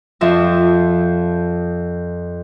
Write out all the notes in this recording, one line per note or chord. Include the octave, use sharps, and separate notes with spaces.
F2 F3 E5